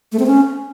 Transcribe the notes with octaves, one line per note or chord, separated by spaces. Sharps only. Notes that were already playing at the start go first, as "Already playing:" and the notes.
A3
C4
C#4